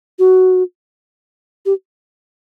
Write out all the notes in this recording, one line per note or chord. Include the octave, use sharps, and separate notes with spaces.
F#4
G4